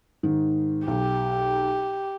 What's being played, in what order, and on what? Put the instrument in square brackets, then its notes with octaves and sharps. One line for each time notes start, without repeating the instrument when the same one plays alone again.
[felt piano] G#2 D#3
[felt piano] B1 [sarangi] G4